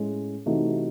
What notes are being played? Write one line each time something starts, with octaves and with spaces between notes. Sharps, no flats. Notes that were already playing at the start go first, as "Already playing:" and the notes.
Already playing: A2 G#3 C#4
C3 E3 A3 D#4 F#4